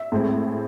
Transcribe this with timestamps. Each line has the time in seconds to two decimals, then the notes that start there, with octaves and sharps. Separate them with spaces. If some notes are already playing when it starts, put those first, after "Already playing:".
Already playing: E5
0.12 A2 G#3 C4